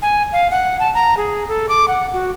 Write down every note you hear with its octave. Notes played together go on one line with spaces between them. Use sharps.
G#5
F5
F#5
A5
A#5
G#4
A4
D6
F#5
F#4